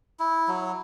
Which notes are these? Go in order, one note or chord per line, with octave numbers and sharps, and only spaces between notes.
E4
F#3